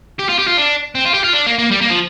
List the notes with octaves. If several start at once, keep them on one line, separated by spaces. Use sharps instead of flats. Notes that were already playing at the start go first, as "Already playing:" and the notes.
G4
F4
G4
F4
D4
C4
F4
G4
F4
D4
A#3
A#3
G3
A#3
F3